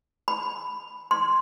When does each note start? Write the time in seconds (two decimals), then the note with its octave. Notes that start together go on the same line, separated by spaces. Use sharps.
0.28 B5
1.11 C6